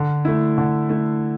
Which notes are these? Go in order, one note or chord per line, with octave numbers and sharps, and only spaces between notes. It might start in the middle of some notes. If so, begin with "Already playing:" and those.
Already playing: D3
A3 E4
D3
A3 E4